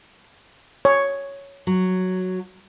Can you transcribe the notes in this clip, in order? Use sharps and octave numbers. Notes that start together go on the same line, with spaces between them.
C#5
F#3